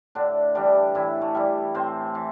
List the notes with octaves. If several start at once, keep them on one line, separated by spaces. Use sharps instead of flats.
A2 D3 D4
D3 E3 G3 D4
A2 E3 E4
A3 A4
E3 G3
A2 C4 C5
E3